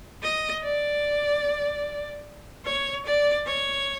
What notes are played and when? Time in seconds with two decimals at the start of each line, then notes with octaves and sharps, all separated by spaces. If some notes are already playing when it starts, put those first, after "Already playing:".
0.23 D#5
0.64 D5
2.66 C#5
3.06 D5
3.46 C#5